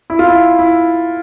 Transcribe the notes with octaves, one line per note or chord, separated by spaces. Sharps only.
E4
F4
E4
E4